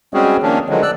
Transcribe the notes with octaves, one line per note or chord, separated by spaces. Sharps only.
G3 G#3 C4 C#4 F#4 G#4
D#3 F3 A#3 C#4 D4
D3 D#3 F3 F#3 G#3
D5 E6 F#6